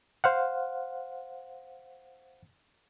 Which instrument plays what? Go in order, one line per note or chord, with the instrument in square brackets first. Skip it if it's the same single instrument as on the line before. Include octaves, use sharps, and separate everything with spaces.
[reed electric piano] C5 F5 F#5